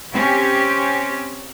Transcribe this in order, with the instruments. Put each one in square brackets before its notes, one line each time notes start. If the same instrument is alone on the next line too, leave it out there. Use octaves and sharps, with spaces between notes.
[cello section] C4 C#4 G4